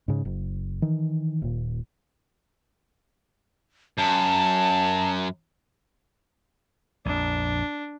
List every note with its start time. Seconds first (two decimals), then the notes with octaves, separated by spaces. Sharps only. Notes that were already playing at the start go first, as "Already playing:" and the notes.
0.08 G#2 C#3
0.25 F#1
0.82 D#3 E3
1.42 D#1 A#2
3.98 F#2 A5
7.06 A#1 F2 D4